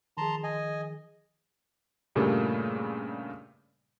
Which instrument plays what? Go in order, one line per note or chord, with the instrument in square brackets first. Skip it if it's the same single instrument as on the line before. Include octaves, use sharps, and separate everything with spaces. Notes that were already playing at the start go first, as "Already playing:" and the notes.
[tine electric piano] D#3 F3 G#4 [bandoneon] A5 A#5 C6
[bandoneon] D#5 G#5
[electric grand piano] G2 A#2 C#3 G3 A3 A#3